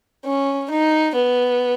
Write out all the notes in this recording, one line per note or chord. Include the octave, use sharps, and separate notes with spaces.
C#4
D#4
B3